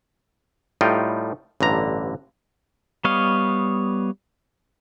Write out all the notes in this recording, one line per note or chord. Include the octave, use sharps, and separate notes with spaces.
A2 G3 D#4 F4 G5
A1 G2 D3 A#5
G3 B3 C#5 D#5 F5